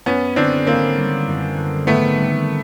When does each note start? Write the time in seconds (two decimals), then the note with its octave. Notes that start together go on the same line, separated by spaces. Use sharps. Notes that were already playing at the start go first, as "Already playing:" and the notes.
0.06 F#2 B3 C#4
0.36 D3 C4 D4
0.66 G#1 A#3 C4
0.97 G3
1.27 F#2
1.57 D3
1.87 G#1 A3 B3
2.17 G3